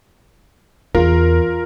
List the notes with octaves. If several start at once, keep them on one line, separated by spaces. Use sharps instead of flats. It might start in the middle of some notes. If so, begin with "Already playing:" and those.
E2 F4 A#4